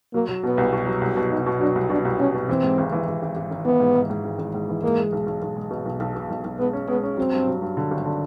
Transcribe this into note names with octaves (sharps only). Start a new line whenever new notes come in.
F#3 A#3
F#3
B2 B3
C2
B2
F#3
C2
B2
C2 D#4
B2
F#3 D4
C2
B2 D4
C2
C2 C#4
B2
E3 C4
G#2
G#1
E3
G#1
G#1
G#1
G#1
E3 B3
G#2
G#2
G#2
G#1
G#1
G#2
E3
G#3 A#3
G#3
B1
B1
B1
G#3
B2
B1
B1
B2
B1
B1
G#3 B3
C#4
G#3 B3
C#4
F#3 C4
G2
F#3
G2
D3
G#1
D3